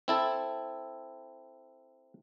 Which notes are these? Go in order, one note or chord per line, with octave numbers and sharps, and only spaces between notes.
C4 E4 A4